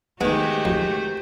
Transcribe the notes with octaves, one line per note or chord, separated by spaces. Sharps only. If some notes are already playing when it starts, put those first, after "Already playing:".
D#3 G#3 A3 B3 F#4 G4 C5
F2